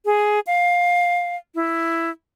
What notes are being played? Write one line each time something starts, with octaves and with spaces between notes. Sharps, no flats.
G#4
F5
E4